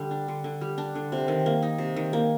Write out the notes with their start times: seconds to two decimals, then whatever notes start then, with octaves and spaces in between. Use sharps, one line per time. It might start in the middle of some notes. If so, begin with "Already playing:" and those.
Already playing: D3 G3
0.11 D4
0.28 D3
0.44 D3
0.61 G3
0.78 D4
0.95 D3
1.12 C3
1.28 D#3
1.46 A#3
1.62 D#4
1.78 C3
1.96 D#3
2.13 A#3